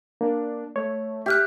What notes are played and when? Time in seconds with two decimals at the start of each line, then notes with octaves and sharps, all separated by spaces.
0.21 A#3 D4
0.76 A3 C#5
1.26 G4 E5 F6 F#6